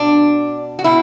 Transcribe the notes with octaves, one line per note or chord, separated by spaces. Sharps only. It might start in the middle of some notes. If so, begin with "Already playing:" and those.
Already playing: B2 D4
F#4
B2 E4